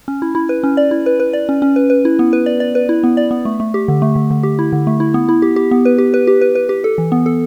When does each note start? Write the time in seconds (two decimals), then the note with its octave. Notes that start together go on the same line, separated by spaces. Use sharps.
0.08 C#4
0.22 E4
0.35 E4
0.49 B4
0.64 C#4
0.77 D5
0.91 E4
1.06 B4
1.20 B4
1.33 D5
1.49 C#4
1.62 C#4
1.76 B4
1.90 B4
2.05 E4
2.19 B3
2.33 B4
2.46 D5
2.60 D5
2.75 B4
2.89 E4
3.04 B3
3.17 D5
3.31 B3
3.45 A3
3.60 A3
3.74 G4
3.88 D3
4.02 A3
4.16 D3
4.31 D3
4.43 G4
4.59 E4
4.73 D3
4.87 A3
5.00 E4
5.14 B3
5.29 E4
5.42 G4
5.56 G4
5.71 B3
5.85 B4
5.98 G4
6.14 B4
6.27 G4
6.41 B4
6.55 B4
6.69 G4
6.84 A4
6.98 E3
7.12 B3
7.26 A4